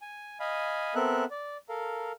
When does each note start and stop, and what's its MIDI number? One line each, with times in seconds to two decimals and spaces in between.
0.01 0.38 80
0.40 0.95 75
0.40 0.95 77
0.40 0.95 80
0.40 0.95 83
0.95 1.25 59
0.95 1.25 60
0.95 1.25 69
0.95 1.25 70
0.95 1.25 76
0.95 1.25 90
1.31 1.57 74
1.69 2.12 69
1.69 2.12 70
1.69 2.12 77